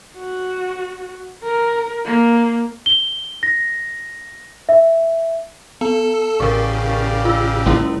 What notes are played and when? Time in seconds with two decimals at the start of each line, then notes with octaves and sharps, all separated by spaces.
0.18 F#4
1.43 A#4
2.05 A#3
2.86 G7
3.43 A#6
4.69 E5
5.81 B3 A4
6.40 A1 C#3 G4 A#4 D5 F5 C#6
7.25 F4 E6
7.66 F#1 C#2 D#3 C#4 E4